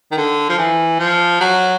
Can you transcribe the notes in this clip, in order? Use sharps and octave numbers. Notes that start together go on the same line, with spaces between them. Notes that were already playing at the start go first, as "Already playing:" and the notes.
D#3
D3
F3
E3
F3
F#3